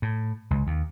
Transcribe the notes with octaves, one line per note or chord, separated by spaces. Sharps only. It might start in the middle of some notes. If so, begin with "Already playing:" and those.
A2
C#2
D#2